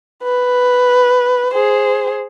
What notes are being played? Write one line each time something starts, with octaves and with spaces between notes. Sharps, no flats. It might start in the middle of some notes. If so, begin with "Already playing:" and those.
B4
G#4 C5